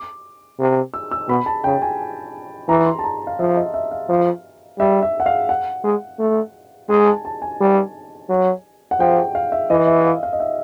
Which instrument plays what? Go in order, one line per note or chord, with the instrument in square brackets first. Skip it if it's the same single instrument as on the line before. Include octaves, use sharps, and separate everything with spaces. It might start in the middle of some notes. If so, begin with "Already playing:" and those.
Already playing: [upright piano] D6
[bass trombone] C3
[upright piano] E6
E6
[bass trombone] B2 [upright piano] B5
[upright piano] A5
[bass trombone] C#3 [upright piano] G5
[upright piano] G#5
[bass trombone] E3 [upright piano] A#5
[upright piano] C6
A5
A#5
F5
[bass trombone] F3 [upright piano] E5
[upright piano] D#5
E5
F5
[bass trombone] F3
[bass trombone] G3 [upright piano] E5
[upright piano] E5
F#5
F5
F#5
[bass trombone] G#3
A3
[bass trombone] G#3 [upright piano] G#5
[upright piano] A5
A5
G#5
[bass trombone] G3
F#3
[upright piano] F#5
[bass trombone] F3 [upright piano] G5
[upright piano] F5
E5
[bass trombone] E3 [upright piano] D#5
[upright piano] E5
F5
F5
D#5
E5